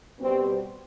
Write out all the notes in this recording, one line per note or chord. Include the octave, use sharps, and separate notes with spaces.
B2 G3 C4